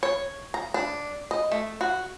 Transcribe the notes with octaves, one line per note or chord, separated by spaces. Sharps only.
C#5
A#5
D4
D#5
A3
F#4